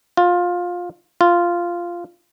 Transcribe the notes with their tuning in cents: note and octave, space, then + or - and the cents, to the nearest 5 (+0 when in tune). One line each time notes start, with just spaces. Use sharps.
F4 +20
F4 -5